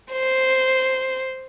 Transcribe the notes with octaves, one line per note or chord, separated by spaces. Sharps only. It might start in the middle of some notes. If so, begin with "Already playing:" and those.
C5